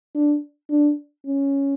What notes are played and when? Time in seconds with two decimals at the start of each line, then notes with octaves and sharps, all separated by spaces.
0.15 D4
0.70 D4
1.26 C#4